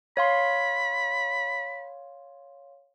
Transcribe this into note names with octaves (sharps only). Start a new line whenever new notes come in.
C#5 F5 B5 C6